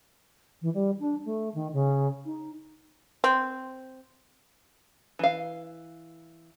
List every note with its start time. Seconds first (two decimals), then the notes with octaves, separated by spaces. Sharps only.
0.61 E3
0.74 G3
0.99 D4
1.24 A3
1.54 D#3
1.72 C#3
2.25 D#4
3.24 C4
5.19 E3 F5